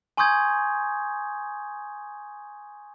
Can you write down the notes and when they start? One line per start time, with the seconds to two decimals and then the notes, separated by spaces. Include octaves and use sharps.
0.17 G#5 C6 C#6 D#6 G6 G#6